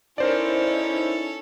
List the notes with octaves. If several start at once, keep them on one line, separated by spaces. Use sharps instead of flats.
C#4 D#4 E4 A4 A#4 C5 D5